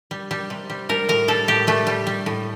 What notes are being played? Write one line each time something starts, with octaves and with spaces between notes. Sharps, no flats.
G3
G3
C3
G3
G3 A#4
A2 A#4
G3 A4
A2 G4
G3 A3
G3
G3
A2